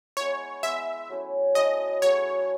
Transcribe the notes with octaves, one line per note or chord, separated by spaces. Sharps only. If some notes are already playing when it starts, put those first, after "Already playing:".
G#3 B3 E4 C#5
G#3 B3 E4 E5
F#3 A3 C#4 E4
F#3 A3 C#4 E4 D#5
F#3 A3 C#4 G#4 C#5